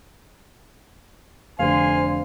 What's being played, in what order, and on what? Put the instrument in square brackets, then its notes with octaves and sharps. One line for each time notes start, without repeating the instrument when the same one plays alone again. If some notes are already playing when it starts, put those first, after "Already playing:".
[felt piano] F1 D3 [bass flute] C5 [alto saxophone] F5 [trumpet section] G#5 C6